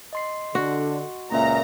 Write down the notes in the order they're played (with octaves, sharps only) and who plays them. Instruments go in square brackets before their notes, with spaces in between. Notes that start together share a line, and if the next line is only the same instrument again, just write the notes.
[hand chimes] D#5 C6 C7
[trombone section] D3 [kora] F#4
[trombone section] C#2 A#2 [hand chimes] A#3 C#4 E5 [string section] A#5